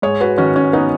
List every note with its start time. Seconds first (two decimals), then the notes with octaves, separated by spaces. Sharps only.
0.02 G#2 G#4 C#5
0.21 F#4 B4
0.38 D#3 C#4 F#4
0.56 C#4
0.73 B3 D#4